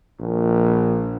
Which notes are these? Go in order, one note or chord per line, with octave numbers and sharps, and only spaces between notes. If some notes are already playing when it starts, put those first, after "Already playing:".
A#1